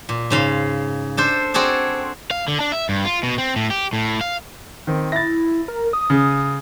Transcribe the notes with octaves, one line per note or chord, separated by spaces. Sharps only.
A#2
G#2 C#3 F5 C6
D4 A4 C5
C4 F#4 G#4 A4 D5
F5
D3
D4
E5
G2
F4
B2
C4
A2
G4
A2
F5
D#3 C4
E4 A6 A#6
A#4
D#6
C#3